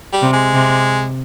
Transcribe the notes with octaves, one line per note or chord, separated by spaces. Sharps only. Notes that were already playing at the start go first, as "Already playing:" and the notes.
G3
C3
G#3
C3